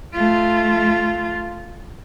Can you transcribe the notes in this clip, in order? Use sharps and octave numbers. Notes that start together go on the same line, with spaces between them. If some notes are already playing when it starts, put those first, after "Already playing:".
A3 F4